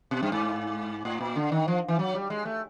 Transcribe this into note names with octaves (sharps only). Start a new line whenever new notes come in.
B2
G2
G#2
A2
A#2
D3
D#3
F3
E3
F#3
G3
G#3
A3